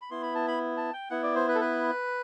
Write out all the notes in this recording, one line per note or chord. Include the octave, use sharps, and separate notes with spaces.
B5
B3 E4 C6
B5
A5
B5
A5
G5
B3 E4 F#5
D5
C5
B4
A4
B4